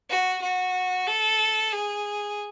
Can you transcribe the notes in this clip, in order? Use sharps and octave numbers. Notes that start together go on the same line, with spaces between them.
F#4
F#4
A4
G#4